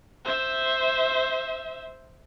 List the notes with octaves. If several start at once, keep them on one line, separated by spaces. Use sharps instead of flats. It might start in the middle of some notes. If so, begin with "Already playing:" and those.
C5 E5